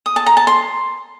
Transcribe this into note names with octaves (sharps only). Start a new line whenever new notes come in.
D#6
A5
A#5
A5
C6